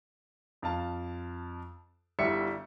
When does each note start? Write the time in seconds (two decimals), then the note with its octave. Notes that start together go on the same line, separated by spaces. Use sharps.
0.62 F2 F5 A5
2.19 G1 G3 E4 E5 C#7